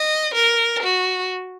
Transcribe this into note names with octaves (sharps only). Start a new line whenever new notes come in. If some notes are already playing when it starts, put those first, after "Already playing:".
Already playing: D#5
A#4
F#4